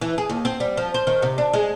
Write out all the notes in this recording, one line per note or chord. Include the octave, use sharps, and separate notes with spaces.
E3
G#4
D#2
C4
G3
F3
C5
D#3
C3
D4
G#3